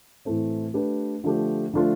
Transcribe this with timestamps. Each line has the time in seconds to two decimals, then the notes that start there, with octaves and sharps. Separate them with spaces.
0.25 A2 E3 A3 C4
0.74 A3 D4 G4 B4
1.24 D3 F3 A3 D4 G4
1.73 D3 F3 A3 D4 F4